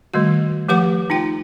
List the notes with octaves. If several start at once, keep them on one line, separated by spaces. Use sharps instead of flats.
D#3 G3 A3 F#4
F3 A3 G4 B4 F#5 D6
D#4 F4 G5